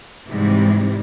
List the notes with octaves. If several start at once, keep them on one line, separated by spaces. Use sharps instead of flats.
G#2 C3 E3 G3